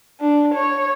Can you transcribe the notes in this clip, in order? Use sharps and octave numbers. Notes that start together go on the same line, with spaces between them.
D4
C#5